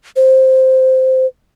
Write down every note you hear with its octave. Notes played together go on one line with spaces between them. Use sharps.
C5